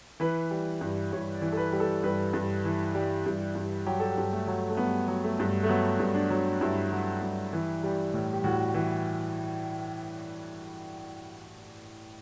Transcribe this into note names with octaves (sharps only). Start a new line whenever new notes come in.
E3 B4
G3
G2
G2 C#5
D5
E3
A4
B4
G3
A4
G2 B4
G2
E3
G3
G2
G2
F#3 G4
A4
G4
G2
A3
F#3
A3
G2 B3
F#3
A3
G2
A3
F#3 B3
G2
D4
F#3
G2 E4
F#3
G2
E3
G3
A2
G4
A2 F#4
E3